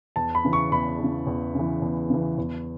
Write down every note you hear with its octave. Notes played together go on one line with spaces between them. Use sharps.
E2 A5
B5
C#3 E3
C#6
E2 B5
C#3 E3
E2
C#3 E3
E2
C#3 E3
E2